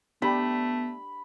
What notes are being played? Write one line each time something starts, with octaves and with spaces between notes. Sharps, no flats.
A3 B3 D4 G4 B5